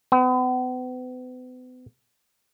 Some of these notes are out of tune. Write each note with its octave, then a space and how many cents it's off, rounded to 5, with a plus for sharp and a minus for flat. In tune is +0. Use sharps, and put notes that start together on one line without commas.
B3 +40